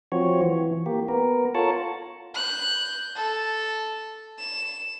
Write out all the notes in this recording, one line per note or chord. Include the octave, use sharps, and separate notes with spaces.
F3 C4 F#4 C#5
E3
A#3 G4
B3 A#4
F4 A4 A#4 C#5 F#5 A5
F#6 G6
A4
E7